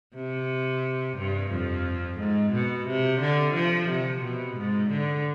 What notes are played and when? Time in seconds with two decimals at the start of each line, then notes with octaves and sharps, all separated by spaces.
0.15 C3
1.17 G2
1.52 F2
2.18 G#2
2.53 B2
2.87 C3
3.21 D3
3.54 F3
3.88 C3
4.22 B2
4.57 G#2
4.90 D3